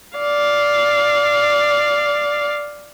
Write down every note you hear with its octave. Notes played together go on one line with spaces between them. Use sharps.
D5 F5